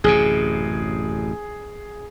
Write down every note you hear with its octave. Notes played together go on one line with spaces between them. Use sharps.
A1 F#2 C3 G#4